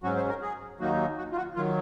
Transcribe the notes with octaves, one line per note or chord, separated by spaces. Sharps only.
G#2 F#3 C#4 F#4
C5
A#4
G#4
D#2 D#3 F#3 A#3 D#4 F#4
F#4
F4
F#4
D#3 F#3 F4